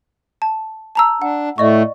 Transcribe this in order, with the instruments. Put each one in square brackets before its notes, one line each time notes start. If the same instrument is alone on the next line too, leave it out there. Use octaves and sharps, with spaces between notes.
[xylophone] A5
A5 A#5 E6
[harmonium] D4 [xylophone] F#5
[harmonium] A2 A3 [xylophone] D5 D#5 C#6